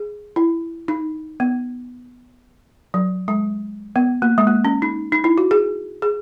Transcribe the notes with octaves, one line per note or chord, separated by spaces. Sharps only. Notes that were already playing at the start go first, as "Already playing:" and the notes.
Already playing: G#4
E4
D#4
B3
F#3
G#3
B3
A#3
G#3
A#3
C#4
D#4
D#4
E4
F#4
G#4
G#4